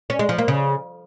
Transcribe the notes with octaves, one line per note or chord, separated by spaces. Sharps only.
C#4
G#3
F3
A#3
C#3